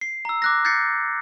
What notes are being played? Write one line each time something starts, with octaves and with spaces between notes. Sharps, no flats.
C7
A#5 E6
D6 F#6 A#6
G6 A6 A#6 C7 C#7